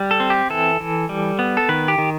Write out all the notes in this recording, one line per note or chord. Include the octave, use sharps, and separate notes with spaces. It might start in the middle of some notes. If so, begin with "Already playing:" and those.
Already playing: G3
A4
C4
G4
E3 A4
E3
G3
B3
A4
D#3 B4
G4
D#3